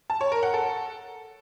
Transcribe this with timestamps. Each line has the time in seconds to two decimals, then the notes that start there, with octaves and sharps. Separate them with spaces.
0.10 A5
0.21 C#5
0.32 A#4
0.43 F#5
0.54 A4